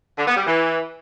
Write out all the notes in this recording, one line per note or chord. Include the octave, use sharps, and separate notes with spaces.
D3
B3
G3
E3